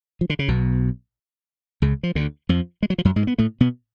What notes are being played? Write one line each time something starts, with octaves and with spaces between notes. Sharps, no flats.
F3
D3
C#3
B1 B2
C#2 C#3
F3
D2 D3
F2 F3
G#3
F#3
F3
F#2 F#3
G#2 G#3
B3
A2 A3
B2 B3